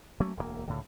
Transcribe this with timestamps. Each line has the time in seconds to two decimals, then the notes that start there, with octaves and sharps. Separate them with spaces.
0.20 F#3 A3 A#3 C#4
0.37 E1 D2 G2 A#3
0.68 C#2 A2 D3